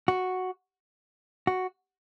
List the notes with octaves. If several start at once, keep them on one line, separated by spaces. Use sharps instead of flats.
F#4
F#4